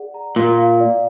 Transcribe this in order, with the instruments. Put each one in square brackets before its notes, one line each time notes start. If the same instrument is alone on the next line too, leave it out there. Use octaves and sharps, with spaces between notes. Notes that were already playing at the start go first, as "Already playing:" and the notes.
Already playing: [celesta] G#4 D5 F#5
A#5
[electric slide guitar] A#2 [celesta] F5
[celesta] F5
D5